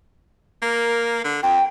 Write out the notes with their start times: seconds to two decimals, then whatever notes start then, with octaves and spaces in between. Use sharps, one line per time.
0.62 A#3 A#4
1.24 D3
1.42 F2 G5